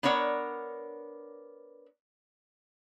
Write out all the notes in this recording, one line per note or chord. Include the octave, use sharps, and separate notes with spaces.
B3 D4 A#4 C#5 D#5 F#5